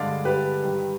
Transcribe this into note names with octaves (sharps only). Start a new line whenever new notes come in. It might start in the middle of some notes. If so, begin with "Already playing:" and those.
Already playing: G2 D3 G#3 D5 F5
G4 B4
G2 D#3 G3